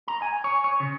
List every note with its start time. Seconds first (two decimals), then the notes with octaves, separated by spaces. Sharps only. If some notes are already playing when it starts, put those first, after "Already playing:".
0.08 A#5
0.22 G#5
0.44 C#5
0.64 C#5
0.80 C#3